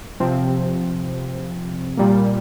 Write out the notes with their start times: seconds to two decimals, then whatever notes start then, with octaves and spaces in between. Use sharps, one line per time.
0.20 C3 F3 C4
1.97 A#2 G3 A#3